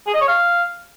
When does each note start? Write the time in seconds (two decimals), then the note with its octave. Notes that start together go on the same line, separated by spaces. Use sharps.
0.07 G#4
0.14 D#5
0.21 C#5
0.28 F5